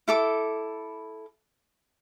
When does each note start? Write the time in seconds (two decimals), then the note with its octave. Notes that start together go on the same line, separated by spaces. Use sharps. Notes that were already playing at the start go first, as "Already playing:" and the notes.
0.08 E4 A4 D6